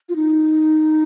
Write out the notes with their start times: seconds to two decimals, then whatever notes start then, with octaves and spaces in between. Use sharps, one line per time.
0.09 F4
0.16 D#4